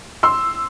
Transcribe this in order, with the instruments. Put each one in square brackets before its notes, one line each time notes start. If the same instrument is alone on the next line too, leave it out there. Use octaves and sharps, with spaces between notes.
[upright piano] C6 E6